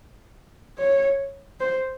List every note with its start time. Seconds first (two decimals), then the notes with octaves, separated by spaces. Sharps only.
0.78 C#5
1.60 C5